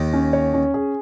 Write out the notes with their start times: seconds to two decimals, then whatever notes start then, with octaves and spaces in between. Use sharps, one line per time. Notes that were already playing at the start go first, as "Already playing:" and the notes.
Already playing: D#2 D#3
0.13 C#4
0.33 C#5
0.54 C#4
0.74 G#4